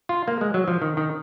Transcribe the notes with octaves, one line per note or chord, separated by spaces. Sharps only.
F4
A#3
G#3
F#3
F3
D#3
D#3